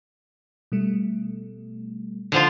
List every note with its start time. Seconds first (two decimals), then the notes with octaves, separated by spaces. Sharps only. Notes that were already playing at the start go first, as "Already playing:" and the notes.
0.72 B2 G3 A3
2.32 D3 F3 F4